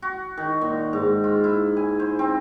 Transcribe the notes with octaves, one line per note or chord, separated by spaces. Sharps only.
F#4
D#3
A#2
G#2
F4
E4
G#5
C5
C4